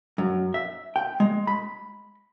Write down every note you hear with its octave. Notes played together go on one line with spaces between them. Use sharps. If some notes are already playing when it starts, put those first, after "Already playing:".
F#2
E5
G5
G#3
B5